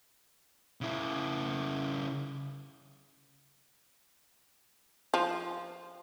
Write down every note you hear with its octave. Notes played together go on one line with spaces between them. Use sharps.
C#3 E4
F3